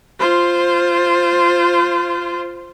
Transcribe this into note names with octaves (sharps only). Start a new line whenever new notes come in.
F4 C5